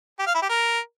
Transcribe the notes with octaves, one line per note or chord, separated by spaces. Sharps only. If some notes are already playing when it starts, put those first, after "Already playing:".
G4
F5
E4
G4
A#4